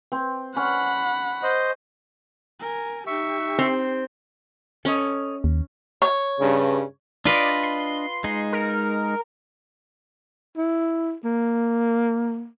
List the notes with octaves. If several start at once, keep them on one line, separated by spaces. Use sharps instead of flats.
C4
C#4 F#5 B5
C5 D#5
A#4 G#5
D#4 G4 E5 C#6
C4
C#4 A4 C#5 D#5
D#2
C#5
G2 C#3
D4 F4 B4 D5 D#5
C6
G#3 D#4
A#4
E4
A#3